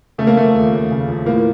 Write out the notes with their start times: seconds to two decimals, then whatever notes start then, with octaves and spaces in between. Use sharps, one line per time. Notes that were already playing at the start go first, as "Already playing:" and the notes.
0.18 C#3 A3
0.27 A#3
0.36 F3 A3
0.55 D#2
0.73 D#2
0.91 C#3
1.08 F3
1.25 A2 A#3